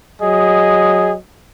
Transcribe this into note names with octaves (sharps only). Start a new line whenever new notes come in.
F#3 G#4 D#5